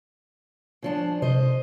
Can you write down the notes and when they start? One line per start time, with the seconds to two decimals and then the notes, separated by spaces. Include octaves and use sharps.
0.82 C#3 F3 D4
1.22 C3 C5 D#5